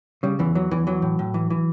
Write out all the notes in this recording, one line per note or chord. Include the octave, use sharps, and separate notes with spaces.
C#3 G3
E2 E3
E3 F#3
E2 E3
E3 F#3
A2
A2
E3
E3